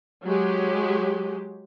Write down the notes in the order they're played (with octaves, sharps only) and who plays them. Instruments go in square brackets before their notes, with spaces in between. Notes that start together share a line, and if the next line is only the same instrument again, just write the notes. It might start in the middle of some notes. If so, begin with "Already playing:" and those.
[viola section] F#3 G#3 G4